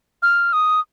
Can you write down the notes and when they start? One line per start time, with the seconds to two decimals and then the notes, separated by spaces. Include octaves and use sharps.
0.23 F6
0.53 D#6